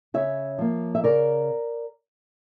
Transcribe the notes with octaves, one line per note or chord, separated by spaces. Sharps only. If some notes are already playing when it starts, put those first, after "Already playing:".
C#3 C#5 E5
F3 A#3
E5
C#3 A#4 D5